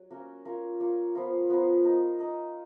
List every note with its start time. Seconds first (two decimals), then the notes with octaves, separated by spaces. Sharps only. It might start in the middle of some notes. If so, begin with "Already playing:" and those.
Already playing: F#3
0.11 A#3 C#4 F#4 A#4
0.45 A#3 F4 A#4 C#5
0.80 A#3 F4 A#4 C#5
1.15 F3 B3 F4 A#4
1.49 F3 B3 F4 A#4
1.84 D#4 A#4 D#5
2.19 D#4 A#4 D#5